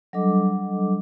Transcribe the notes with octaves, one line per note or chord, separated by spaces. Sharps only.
F#3 G3 D4 A4 D#5 D6